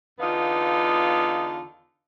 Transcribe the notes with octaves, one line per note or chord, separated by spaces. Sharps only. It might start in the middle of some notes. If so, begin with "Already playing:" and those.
E2 D3 B3 D#4 F4 F5